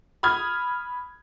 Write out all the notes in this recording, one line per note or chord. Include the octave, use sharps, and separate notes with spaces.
B5 D#6 F6 G#6